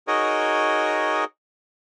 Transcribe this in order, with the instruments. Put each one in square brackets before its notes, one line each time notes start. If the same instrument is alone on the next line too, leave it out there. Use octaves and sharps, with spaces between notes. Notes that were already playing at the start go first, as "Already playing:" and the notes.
[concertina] D#4 F#4 G#4 A#4 C#5 D#5